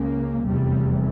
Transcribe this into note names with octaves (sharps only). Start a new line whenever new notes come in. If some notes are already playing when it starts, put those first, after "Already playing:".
Already playing: C#2 C#3 A#3
F1 E2 C3 G3